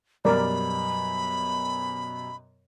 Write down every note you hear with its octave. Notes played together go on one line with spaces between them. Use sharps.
F#2 B2 G3 A#4 D5 B5